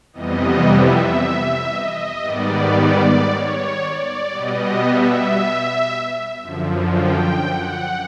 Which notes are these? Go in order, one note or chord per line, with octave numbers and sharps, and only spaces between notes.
F2 C3 E3 G3 B3 D#5
E5
D#5
G#2 D#3 G3 B3 D5
D5
C#5
D5
B2 G3 B3 D#5
E5
F#2 D3 F3
G5
F#5